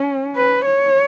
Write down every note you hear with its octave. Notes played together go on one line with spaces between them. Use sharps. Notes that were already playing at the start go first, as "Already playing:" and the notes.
Already playing: C#4
B4
C#5